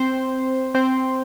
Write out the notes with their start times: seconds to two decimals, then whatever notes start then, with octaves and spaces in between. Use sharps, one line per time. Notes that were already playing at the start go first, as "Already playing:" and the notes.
Already playing: C4 C5
0.75 C4 C5